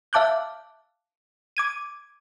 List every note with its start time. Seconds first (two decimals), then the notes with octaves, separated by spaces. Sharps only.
0.13 E5 F5 A5 D6 F#6 G6
1.57 D6 G#6 D#7